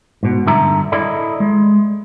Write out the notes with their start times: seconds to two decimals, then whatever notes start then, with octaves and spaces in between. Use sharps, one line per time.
0.23 G#2 B2
0.46 G2 D3 E5 A#5
0.92 E4 A4 D5 D#5
1.40 G#3